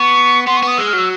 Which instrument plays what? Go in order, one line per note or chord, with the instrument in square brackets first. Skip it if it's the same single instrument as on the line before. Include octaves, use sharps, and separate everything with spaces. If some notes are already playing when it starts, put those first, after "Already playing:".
Already playing: [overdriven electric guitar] B3 [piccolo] C#6
[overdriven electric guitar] B3 [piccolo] C6
[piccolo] C#6
[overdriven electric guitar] B3 [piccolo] D#6
[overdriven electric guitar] G#3 [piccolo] E6
[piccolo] F6
[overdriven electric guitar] F#3
[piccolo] E6